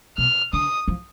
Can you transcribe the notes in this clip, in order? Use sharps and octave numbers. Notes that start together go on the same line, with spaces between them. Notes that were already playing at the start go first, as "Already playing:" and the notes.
B2 F6
D3 D#6
F3